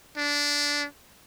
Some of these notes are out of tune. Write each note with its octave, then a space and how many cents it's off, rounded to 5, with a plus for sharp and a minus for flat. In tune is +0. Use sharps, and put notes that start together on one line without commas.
D4 -15